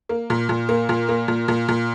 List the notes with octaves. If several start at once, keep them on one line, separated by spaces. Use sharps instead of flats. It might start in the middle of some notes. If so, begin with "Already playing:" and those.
A#3
A#2
A#2
A#3
A#2
A#3
A#2
A#2
A#2